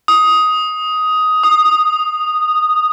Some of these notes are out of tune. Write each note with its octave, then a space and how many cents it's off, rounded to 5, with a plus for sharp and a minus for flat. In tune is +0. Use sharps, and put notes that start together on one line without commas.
D#6 +10
D#6 -10